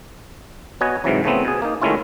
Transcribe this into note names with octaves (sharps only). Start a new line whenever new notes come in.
B3 F#4 C#5 D#5 G#5
G#2 C3 E3 F#3
C#3 A3 B3 C4
B2 G#4
A#3 D#4
D#3 G#3 A3 C#4 E4 F4